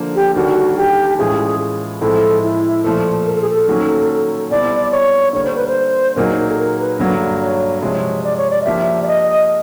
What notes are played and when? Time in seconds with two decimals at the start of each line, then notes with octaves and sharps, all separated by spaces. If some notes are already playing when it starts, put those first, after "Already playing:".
Already playing: D3 F3 A#3
0.15 G4
0.35 D#2 D3 G3 A#3 F#4
0.77 G4
1.18 A2 E3 G#3 C#4 F4 G#4
2.01 A2 F3 G#3 C4 E4 A4
2.43 E4
2.84 A#2 F3 A3
3.26 A#4
3.34 A4
3.42 G#4
3.49 A4
3.68 D#3 F#3 A#3 C#4
4.51 B2 G3 C4 E4 D5
4.92 C#5
5.33 D3 G3 A#3 C#5
5.44 C5
5.56 B4
5.67 C5
6.16 A#2 F#3 A#3 D#4 G#4 A#4
6.48 A4
6.58 A#4
6.79 B4
6.99 G2 D3 F#3 A#3
7.41 C#5
7.82 C3 F3 G#3 C#5
8.24 D5
8.37 C#5
8.50 D5
8.62 D#5
8.65 F3 A#3 D4 G4 A#4 E5
9.02 D5
9.07 D#5